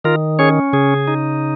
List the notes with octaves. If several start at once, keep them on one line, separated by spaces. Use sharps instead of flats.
D#3 F4 A#4
C#4 G#4 C#5
C#3 G#4
D#4